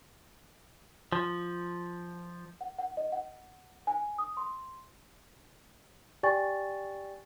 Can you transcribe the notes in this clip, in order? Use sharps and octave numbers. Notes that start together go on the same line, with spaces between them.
F3
F#5
F#5
D#5
F#5
G#5
D#6
C6
G4 D5 G5 G#5 C#6 A6